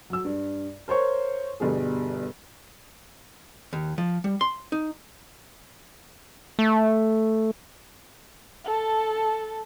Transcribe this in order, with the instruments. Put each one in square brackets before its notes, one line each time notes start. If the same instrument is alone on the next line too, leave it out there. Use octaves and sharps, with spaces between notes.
[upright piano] F#3 E6
G2
A#4 C5 C#5 C#6
G1 B2 G3 G#4
[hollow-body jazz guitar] D#2
F3
G3
C6
D#4
[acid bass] A3
[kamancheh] A4 A5